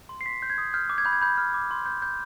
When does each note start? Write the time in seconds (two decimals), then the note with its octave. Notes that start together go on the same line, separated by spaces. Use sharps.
0.09 C6
0.21 C7
0.26 C6 B6
0.42 G6
0.50 G#6
0.58 D#6
0.74 F6 G6
0.90 D6
0.98 G#6
1.05 B5 G6
1.13 G#6
1.21 B5 G6
1.38 F6
1.54 D6
1.71 C6
1.86 G6
2.02 G6